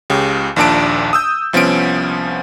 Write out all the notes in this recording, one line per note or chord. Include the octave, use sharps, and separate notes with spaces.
C#2 C#3 G4
A#1 D#2 A#2 D4 A5 D7
D#6 E6 G6
C2 F3 B3 C#4 D7